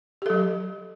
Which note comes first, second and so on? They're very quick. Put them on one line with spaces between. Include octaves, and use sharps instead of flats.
G4 A4 F#3